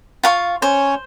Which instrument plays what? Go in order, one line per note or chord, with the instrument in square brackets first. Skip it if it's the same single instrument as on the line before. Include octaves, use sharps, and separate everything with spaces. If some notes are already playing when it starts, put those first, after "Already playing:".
[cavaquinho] F4 F5 C#6
[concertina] C#4 C#5 [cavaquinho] C5